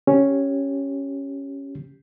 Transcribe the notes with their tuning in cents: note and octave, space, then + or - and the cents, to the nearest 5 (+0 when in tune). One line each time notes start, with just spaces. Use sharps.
C#4 +0 G4 -5